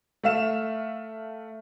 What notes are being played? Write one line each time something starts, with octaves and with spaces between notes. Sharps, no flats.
A3 E5 F5 E7